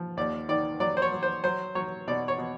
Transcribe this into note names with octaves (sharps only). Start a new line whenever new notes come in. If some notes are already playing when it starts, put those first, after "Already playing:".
Already playing: F3
D#2 D5
D#3 D5
F#3 D5
C5
C#5
F#3
C5
F#3 C5
F#3 C#5
B2 D5
C#5
B2